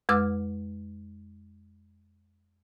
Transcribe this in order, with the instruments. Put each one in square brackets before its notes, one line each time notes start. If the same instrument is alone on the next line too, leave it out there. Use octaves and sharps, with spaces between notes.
[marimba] F2 G#3 B4 D6 E6 F6